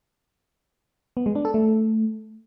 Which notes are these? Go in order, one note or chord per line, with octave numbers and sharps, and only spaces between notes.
B3
G#3
D4
A4
A3